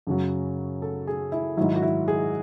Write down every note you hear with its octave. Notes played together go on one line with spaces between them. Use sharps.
F#2 C#3 F#3
A4
G#4
E4
G#2 D#3 F#3 E4
F#4
E4
G#4